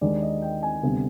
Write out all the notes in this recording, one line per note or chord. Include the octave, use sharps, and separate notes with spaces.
D#2 D#3 G#3 D4 D5
D#5
G5
G#5
D2 C3 G3 B3